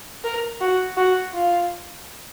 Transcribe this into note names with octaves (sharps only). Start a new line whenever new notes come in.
A#4
F#4
F#4
F4